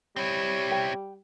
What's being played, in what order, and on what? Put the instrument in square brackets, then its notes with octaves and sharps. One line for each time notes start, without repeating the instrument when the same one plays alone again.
[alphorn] G3 [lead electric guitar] C4 E4 [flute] C#5
[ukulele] G5